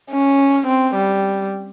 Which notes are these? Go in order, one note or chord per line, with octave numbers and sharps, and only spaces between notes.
C#4
C4
G3